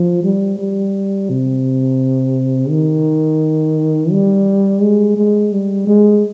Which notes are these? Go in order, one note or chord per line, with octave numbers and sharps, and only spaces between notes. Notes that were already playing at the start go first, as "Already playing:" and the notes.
Already playing: F3
G3
G3
C3
D#3
G3
G#3
G#3
G3
G#3